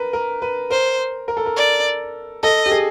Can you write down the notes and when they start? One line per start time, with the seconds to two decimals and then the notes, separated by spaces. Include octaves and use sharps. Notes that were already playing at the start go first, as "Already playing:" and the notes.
Already playing: A#4 B4
0.13 A#4
0.42 B4
0.70 A#4 C5
1.28 A#4
1.37 A4
1.46 A#4
1.57 D5
2.43 A4 D#5
2.66 G4
2.71 G#4